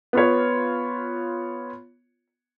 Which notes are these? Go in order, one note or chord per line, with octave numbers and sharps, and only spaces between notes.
B3 F4 C#5